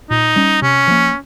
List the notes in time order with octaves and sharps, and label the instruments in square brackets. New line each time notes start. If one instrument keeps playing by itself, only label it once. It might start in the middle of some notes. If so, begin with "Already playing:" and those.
[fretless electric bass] A#2 [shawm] D#4
[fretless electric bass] G3 C#4
[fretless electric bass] C3 [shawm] C#4
[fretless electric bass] F3 A#3